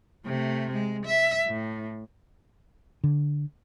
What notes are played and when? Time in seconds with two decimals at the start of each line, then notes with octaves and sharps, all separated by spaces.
0.25 C3 A3
0.73 G#3
1.06 E5
1.47 A2
3.04 D3